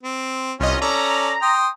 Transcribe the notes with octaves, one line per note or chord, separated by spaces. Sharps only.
C4
C2 C#4 F4 D#5
C#4 A4 D5 A#5
G5 C6 D#6